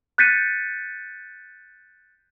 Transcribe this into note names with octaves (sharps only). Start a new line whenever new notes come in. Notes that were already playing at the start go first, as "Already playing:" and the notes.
F#6 G6 A6 B6 C#7 D#7